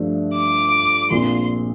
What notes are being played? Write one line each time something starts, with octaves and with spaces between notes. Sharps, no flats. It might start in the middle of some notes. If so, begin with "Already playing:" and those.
Already playing: G2 F3 A3 D4
D6
A#1 A#2 F3 C4 C6